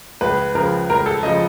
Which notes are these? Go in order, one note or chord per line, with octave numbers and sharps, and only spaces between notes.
C#2 B4
C#3 F3 A#4
C#2 A#4
A4
C#3 F3 D#5